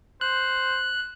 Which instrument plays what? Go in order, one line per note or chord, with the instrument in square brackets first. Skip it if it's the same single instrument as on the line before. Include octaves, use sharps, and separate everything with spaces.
[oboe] C5 [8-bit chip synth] F#6